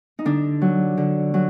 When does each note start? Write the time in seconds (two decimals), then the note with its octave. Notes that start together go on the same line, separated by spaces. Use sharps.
0.19 D#4
0.25 D3 D4
0.62 F#3
0.97 D3
1.34 F#3